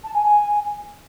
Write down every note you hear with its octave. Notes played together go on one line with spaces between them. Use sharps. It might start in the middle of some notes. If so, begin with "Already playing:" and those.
A5
G#5
G#5